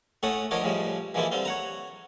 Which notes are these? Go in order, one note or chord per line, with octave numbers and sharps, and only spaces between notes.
A2 A3 C#4 A4 F#5 D#6
D3 F3 A#4 C#5 D#5 D6
A2 C#3 F3 G3 G#3
E3 F3 G#3 A#3 E4 F4
D3 G3 C4 F4
C#5 F#5 A#5